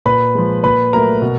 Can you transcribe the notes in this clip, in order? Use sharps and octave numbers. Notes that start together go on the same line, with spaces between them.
A#2 B4 B5
F3 G#3
A#2 B4 B5
F#3 A3 A#4 A#5
B2